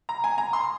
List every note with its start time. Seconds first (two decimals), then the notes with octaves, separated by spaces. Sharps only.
0.09 A#5
0.24 G#5
0.38 A#5
0.53 C6